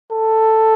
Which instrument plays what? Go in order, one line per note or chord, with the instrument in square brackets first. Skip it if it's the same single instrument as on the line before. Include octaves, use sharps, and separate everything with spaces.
[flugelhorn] A4